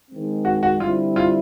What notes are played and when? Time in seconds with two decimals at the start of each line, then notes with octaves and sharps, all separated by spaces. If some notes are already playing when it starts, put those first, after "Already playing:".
0.09 D#3 G#3 C4
0.45 F#4
0.63 F#4
0.80 D3 G3 C4 E4 F4
1.16 F4